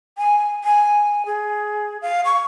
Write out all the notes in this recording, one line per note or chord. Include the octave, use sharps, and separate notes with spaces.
G#5
G#5
G#4
F5
C#6